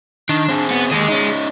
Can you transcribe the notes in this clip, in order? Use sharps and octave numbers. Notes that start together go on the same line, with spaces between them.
D#3 D4
C4 G#4
B3
D#2 G#4 D#5
C#4 D#4